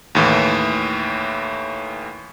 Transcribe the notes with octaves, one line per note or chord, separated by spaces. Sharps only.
D#2 A2 E3